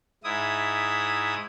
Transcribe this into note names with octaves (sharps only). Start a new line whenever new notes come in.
G#2 E4 D#6